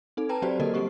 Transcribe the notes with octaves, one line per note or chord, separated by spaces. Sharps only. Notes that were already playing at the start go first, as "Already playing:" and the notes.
C4 D#4 A4
B4 G5 A5 A#5
F#3 C4 F#4 G4 C5 D5
D3 A#3 F#4 A4 A#4 D#5
G3 A#3 C4 G4 C#6